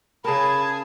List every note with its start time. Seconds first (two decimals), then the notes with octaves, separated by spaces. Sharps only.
0.24 C#3 G#4 A#4 G#5 A5 B5